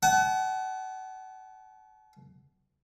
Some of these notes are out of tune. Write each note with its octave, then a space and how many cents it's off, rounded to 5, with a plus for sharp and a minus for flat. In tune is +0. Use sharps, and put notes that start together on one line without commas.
F#5 +30 A5 -40